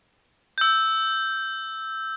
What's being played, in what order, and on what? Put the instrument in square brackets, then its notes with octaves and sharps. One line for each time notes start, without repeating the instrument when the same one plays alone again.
[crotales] E6 G6